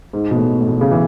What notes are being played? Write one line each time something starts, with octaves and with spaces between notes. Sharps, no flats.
G#2
B2
A2
A2
B2
C#3
E3